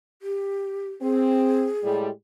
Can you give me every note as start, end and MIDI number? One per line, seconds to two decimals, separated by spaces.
0.22 0.91 67
1.02 1.67 60
1.02 1.94 68
1.83 2.09 45
1.83 2.09 55
1.83 2.09 56